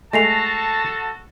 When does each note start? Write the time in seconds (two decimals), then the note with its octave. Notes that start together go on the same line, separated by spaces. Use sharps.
0.13 G#3 A3 F#4 A4 A5 A#6 C7 F7